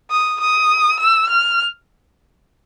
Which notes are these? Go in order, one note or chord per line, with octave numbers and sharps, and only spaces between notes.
D#6
D#6
E6
F6